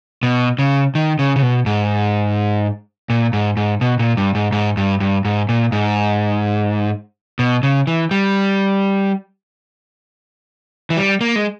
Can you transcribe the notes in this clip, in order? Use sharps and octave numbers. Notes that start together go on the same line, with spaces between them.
B2
C#3
D#3
C#3
C#3
B2
G#2
A#2
G#2
G#2
B2
A#2
G2
G#2
G#2
G2
G2
G#2
A#2
G#2
B2
C#3
E3
G3
E3
G3
A#3
G#3